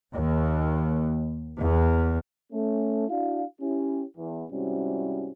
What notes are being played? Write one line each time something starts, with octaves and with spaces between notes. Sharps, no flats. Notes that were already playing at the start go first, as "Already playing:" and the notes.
D#2
E2
A3 C#4
D4 E4 F#4 F5
C#4 E4 G4
E2
G#2 C3 G3 C#4 E4 F#4